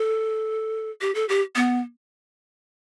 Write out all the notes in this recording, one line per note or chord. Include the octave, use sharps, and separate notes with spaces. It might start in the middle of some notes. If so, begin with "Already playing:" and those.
Already playing: A4
G4
A4
G4
B3